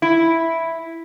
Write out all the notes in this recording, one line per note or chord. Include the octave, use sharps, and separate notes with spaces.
E4